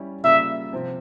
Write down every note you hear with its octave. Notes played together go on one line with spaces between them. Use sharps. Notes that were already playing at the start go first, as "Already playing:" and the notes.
Already playing: G3 C#4 E4
C#3 G3 A#3 F4 E5
C3 F3 C4 F4